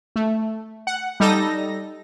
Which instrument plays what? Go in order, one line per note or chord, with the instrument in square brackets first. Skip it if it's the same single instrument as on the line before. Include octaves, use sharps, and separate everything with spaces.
[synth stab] A3
F#5
G3 D#4 A4 A#6